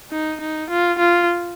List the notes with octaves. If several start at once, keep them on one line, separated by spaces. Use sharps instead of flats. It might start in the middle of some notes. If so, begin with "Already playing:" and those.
D#4
D#4
F4
F4